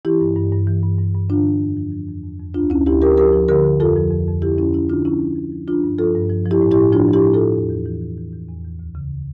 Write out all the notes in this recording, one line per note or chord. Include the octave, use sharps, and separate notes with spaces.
E3 E4 G4
G2
G2
G2
E3
G2
G2
G2
D3 D4 F4
D3
F2
F3
F3
F2
F2
F2
D2 D4 F4
D2 C#4 E4
D2 E4 G4
F3 G4 A#4
F3 G4 A#4
F3
D3 G4 A#4
D3
F2 F4 A4
F3
F2
F2
D3 E4 G4
F2 C#4 E4
F2 C#4 E4
D3 D4 F4
F3 C#4 E4
F3
F3
F3
F3 D4 F4
G2
F3 F4 A4
G2
F3
F3
E4 G4
A2
E4 G4
A2
F3 D4 F4
F3
E4 G4
A2
F4 A4
A2
E2
E3
E3
E3
E3
E3
E2
E3
D2
C#3